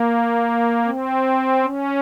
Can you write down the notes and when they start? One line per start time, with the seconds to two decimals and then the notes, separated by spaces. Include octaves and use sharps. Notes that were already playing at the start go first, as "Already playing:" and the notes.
Already playing: A#3
0.85 C4
1.63 C#4